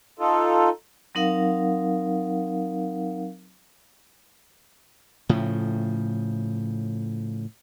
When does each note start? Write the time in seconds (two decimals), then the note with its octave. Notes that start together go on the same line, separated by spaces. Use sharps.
0.20 D#4 F4 A4
1.15 F#3 C4 D#4 A#4 F5 F#5
5.29 A2 C#3 F3